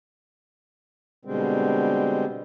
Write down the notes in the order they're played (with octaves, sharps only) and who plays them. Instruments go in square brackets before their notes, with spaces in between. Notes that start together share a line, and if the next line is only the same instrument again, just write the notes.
[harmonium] B2 D3 G3 G#3 C4